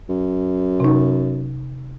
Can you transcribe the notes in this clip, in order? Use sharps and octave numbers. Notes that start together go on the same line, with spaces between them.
F#2
C3 D#4